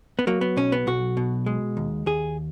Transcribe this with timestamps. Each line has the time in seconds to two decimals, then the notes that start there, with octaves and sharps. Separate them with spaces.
0.19 B3
0.27 F#3 A#3
0.41 B3
0.57 B1 C#4
0.72 B3
0.87 B1 F#4
1.17 B2
1.46 G#3
1.77 D#2
2.06 D#2 G#4